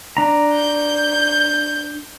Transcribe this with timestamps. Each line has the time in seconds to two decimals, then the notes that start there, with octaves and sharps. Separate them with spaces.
0.17 D4 A#5
0.53 G6